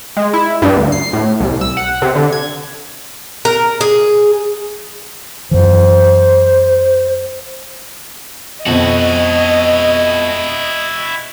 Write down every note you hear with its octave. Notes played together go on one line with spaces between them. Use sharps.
G#3
E4
G2
D2
C7
A2
C2
E6
F#5
C3
D3
G#6
A#4
G#4
F#2 E3 C5
F2 B2 C4 E4 F#4 D#5